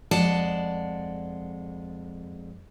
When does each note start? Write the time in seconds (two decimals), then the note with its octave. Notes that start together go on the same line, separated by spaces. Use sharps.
0.11 F2 G#3 D5 F#5 A5